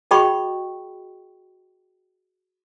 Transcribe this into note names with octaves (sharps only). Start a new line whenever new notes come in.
F#4 G#4 D#5 G5 B5 C#6